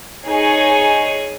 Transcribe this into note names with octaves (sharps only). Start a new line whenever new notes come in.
D#4 G#4 C#5 G#5